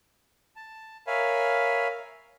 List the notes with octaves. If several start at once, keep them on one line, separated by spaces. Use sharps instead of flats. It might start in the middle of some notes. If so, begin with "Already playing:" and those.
A5
A#4 C#5 E5 F5 G#5 B5